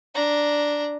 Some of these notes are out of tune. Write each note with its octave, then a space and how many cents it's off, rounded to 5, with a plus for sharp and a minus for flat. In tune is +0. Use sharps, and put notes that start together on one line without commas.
D4 +0 A#5 +0